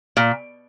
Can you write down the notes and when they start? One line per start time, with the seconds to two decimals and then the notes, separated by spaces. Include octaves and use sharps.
0.17 A#2